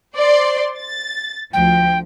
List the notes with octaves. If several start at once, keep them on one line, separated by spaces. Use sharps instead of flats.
C5 D5 C6
A6
D2 F3 G5